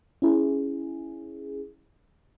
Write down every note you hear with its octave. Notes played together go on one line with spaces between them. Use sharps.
C#4 E4 G#4